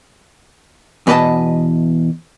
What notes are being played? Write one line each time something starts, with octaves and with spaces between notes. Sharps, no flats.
E2 B2 B4 D5 D#5 A5